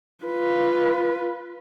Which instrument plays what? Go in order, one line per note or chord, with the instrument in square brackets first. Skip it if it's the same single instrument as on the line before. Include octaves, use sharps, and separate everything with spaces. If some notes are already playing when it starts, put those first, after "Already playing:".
[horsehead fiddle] F4 B4